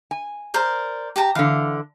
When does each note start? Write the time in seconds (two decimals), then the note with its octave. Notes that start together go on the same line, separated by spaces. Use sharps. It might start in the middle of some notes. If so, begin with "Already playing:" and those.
0.11 G#5
0.54 A#4 C5 D5
1.16 G4 A5 A#5
1.35 D3 E3 F5